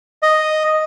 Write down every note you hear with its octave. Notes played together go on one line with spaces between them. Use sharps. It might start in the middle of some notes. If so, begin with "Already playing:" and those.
D#5